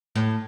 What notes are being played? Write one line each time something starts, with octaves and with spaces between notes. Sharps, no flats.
A2